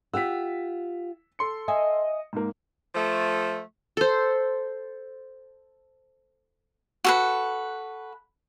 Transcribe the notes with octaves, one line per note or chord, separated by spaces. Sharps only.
F4 G4 F#5 E6 B6
A4 C6 C#7
D#5 E5 G#5
G#2 A#3
F3 A3
A4 C5
F#4 A4 B4